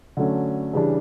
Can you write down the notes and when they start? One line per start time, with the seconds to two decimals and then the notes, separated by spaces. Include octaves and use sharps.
0.17 D3 F#3 A3 C#4
0.73 C#3 E3 G3 D4